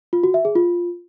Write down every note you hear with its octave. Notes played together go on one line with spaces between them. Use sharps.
F4
F#4
E5
G#4
F4